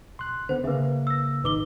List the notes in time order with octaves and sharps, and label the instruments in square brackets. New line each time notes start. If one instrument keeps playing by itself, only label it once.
[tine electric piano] C6 F#6
[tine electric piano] D3 B3 [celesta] C5
[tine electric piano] C#3 A#3 [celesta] B4 E5
[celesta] E6 A#6
[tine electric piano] G#1 D#4 [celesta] B4 D6 G7